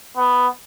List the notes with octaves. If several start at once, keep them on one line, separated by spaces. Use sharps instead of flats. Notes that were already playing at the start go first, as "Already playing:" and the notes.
B3